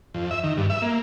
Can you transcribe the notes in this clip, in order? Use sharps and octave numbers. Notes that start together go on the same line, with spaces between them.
F2
E5
D#3
G2
E5
A#3